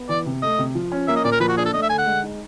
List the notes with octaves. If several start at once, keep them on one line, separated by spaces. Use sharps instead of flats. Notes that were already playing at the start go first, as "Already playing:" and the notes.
Already playing: B3
E3 D5
C3
A3 D#5
C3
F3
C#4
A#3 E5
D#5
A#2 D5
A#4
F3 B4
F#4
D4 G#4
A4
A3 D#5
E5
D3 G#5
F#5
G#3
D#4